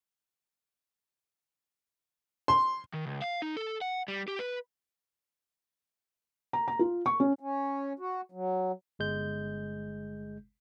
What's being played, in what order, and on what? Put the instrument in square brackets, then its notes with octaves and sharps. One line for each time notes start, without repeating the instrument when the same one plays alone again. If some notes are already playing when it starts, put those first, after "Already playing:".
[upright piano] C6
[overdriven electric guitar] D#3
C#2
F5
D#4
A4
F#5
G3
G4
B4
[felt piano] A#5
A#5
F4
C#6
C#4
[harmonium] C#4
F#4
F#3
[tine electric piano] G1 G#3 G6